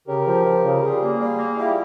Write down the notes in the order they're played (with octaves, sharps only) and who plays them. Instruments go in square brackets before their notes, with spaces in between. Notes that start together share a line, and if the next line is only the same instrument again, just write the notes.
[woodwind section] C#3 [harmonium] G4 A#4
[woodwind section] F3
F3
C#3
[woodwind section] G3 [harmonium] F4 G#4
[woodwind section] A#3
G3
A#3
[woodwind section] G3 [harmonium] E4 G4